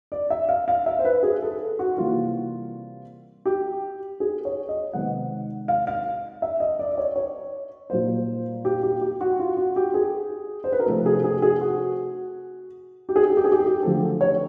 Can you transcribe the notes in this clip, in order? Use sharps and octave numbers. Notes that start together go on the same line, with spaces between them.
D5
E5
F5
F5
E5
C5
B4
G#4
A4
F#4
C3 E3 G3 A#3 F4
G4
G#4
C#5
D#5
C3 D#3 G#3 B3 F#5
F5
F5
E5
D#5
D5
D5
C#5
C#5
A#2 G3 A#3 C5
G4
G4
G4
F#4
F4
F#4
G4
G#4
C5
B4
A#4
C3 F3 A3 A4
G#4
G#4
G#4
F#4
G4
G#4
G4
G#4
G4
G#4
G4
G#4
G4
D3 F3 A3 C4 A4
C#5